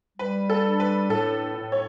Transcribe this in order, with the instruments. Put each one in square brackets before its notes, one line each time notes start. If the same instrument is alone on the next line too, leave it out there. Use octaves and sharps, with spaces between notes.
[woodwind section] G3 [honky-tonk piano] B4
[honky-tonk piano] A4
[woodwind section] D4
[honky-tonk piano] B4
[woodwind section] A2 [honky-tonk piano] A4
[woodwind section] A2
[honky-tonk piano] C#5